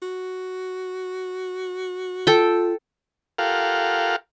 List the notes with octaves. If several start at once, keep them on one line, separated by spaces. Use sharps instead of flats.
F#4
F4 A4 G5
F4 G4 A4 A#4 F5 F#5